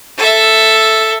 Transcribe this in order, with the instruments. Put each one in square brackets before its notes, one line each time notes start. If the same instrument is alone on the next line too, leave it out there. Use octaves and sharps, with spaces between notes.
[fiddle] A4 E5